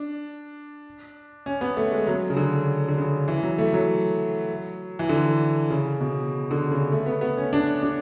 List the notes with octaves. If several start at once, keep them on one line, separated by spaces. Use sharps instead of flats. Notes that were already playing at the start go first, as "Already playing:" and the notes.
Already playing: D4
C#4
B3
A3
G#3
F#3
C#3
D3
D3
C#3
E3
F#3
A3
F#3
E3
D3
C#3
B2
D3
C#3
A3
B3
B3
C#4
D4
D4